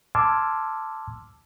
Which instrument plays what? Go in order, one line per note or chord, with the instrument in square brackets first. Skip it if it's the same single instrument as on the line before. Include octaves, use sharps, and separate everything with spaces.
[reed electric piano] A5 C6 D6 E6 F6 G#6